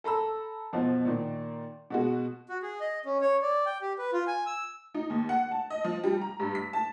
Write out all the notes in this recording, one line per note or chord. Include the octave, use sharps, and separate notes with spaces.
A4 A#5 B5 E6
B1 B2 F3
A#2 D#3
B2 G#3 F#4
F#4
G#4
D#5
C#4
C#5
D5
G5
G4
B4
F4
G#5
E6
D#4
D#2
F#5
A5
D#5
F3
G3
A#5
G2
B6
A5